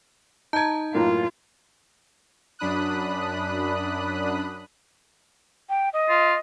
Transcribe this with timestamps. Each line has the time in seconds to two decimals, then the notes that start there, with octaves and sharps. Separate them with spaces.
0.53 D#4 A5 A#5 G6 G#6
0.94 F#2 A2 A#3 F4
2.59 F#2 D4 B5 D#6 F#6
5.70 G5
5.93 D#5
6.09 F4